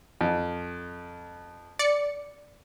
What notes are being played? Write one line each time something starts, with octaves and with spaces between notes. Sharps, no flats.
F2
D5 C#7